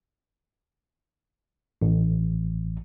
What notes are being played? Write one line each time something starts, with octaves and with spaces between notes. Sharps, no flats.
A1